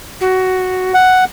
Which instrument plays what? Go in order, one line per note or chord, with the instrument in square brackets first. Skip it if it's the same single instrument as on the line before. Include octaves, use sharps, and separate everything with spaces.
[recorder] F#4
[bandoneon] F#5